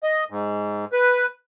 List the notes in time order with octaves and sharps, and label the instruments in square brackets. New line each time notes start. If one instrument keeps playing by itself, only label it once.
[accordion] D#5
G#2
B4